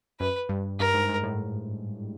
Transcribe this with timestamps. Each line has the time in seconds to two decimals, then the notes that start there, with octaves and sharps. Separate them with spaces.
0.20 F#2 B4
0.49 G2
0.79 G2 A#4
0.94 G#2
1.09 G#2
1.24 A2